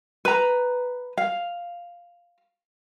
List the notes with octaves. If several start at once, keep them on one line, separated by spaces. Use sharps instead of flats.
B4 A#5
F5